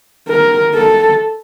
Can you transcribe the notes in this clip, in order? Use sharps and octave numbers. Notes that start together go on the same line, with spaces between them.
A#4
A4